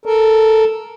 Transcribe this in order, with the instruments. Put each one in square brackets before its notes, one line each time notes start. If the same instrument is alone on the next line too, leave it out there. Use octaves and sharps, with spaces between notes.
[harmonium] A4 A#4